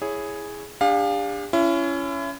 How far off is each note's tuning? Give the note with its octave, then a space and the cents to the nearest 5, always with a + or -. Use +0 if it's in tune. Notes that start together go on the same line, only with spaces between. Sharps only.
E4 +0 G#4 +0 C#5 +0
D4 +0 G4 +45 F5 +20
C#4 +15 E4 +35